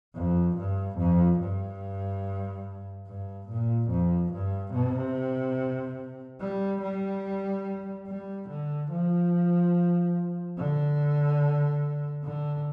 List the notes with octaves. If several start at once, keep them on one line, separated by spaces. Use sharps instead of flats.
F2
G2
F2
G2
G2
A#2
F2
G2
C3
G3
G3
G3
D3
F3
D3
D3